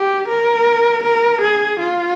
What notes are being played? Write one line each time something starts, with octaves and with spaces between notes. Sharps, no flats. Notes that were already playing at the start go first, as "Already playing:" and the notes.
Already playing: G4
A#4
A#4
G#4
F4